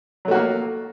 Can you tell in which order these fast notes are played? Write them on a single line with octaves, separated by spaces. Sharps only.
F#3 A3 F#4 A#3